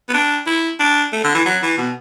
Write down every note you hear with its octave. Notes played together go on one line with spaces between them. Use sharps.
B3
D4
E4
D4
A3
D3
E3
F#3
E3
B2